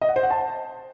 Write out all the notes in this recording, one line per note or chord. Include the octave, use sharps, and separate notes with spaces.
D#5
F#5
C5
F#5
A5